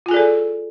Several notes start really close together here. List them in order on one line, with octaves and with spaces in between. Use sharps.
F4 G#5 G#4 D5 A4